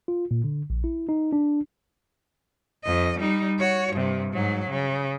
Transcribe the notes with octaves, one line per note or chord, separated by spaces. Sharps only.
F4
A#2
D3
A#1
E4
D#4
D4
F2 D#5
G3 D#4
F#4 C#5
G2 C3
G#2 F#3
C#3